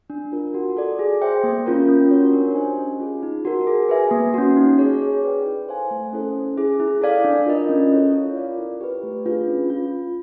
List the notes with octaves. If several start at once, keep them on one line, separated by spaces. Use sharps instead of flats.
D4
F4 A#4
F#4
A4 D5
G#4
C5 E5 G5
A#3
C#4 F4 A#4
C#4
F#4 A#4 C#5
D4
G4 C5 D#5 G#5
C#4
F4 G#4
D#4
F#4 A#4
G#4
B4 E5 G#5
A#3
C#4 F#4
D#4
G#4 C#5
G#4
B4 D5 G5
E4
A4 C5 F5 G#5
A3
C#4 E4 A4 C5
C#4
E4 G#4
E4
A4 D5 F5
D4
F4 A#4 D#5
C#4
E4 A4 C#5
F4
A#4 D5 F5
E4
G4 B4
A3
D4 F4 G#4 B4
C#4
F4